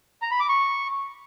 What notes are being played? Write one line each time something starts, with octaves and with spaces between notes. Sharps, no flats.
A#5
B5
D6
C#6